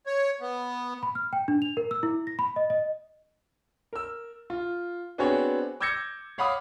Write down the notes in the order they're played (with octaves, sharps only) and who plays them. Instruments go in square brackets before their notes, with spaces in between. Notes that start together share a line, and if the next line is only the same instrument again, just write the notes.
[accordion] C#5
B3
[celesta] B5
F6
G5
D4
F7
A#4
E6
E4
A#6
B5
D#5
D#5
[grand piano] A#4 E6
F4
B3 C4 D4 F#4 G#4 C#5
D6 E6 G6 G#6 A#6 C#7
C#5 F5 F#5 B5 D6 D#6